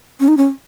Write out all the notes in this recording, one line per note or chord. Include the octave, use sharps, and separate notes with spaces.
C#4
D#4
C#4